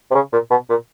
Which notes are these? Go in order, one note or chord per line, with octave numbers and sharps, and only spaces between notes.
C3
C#3
A#2
B2
A#2